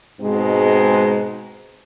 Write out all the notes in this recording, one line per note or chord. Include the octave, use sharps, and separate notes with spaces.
G#2 B2 G#3 C4 D#4